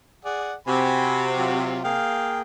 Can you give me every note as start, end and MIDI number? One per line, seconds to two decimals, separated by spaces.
0.25 0.54 68
0.25 0.54 74
0.25 0.54 78
0.67 1.97 48
0.67 1.57 60
0.67 1.57 66
0.67 1.28 80
0.67 1.28 83
1.37 1.80 54
1.37 1.80 65
1.84 2.42 58
1.84 2.42 68
1.84 2.41 77
1.84 2.41 79